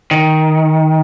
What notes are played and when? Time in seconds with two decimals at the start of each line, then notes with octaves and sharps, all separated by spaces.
0.11 D#3